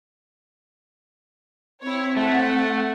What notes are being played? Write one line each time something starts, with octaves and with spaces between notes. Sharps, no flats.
C4 E4 C#5
A3 F#5